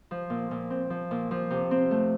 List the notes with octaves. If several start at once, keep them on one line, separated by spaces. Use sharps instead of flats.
F3
A#2
A#2
C4
F3
A#2
F3
C3
C4
A3